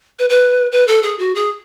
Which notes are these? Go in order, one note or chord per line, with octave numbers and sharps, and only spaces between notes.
B4
B4
B4
A4
G#4
F#4
G#4